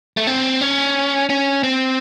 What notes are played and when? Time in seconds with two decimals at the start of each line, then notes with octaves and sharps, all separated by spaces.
0.17 A3
0.27 C4
0.61 C#4
1.30 C#4
1.63 C4